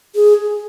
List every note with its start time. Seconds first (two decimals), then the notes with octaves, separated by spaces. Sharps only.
0.15 G#4